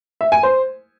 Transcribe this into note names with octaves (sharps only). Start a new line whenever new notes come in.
E5
G#5
C5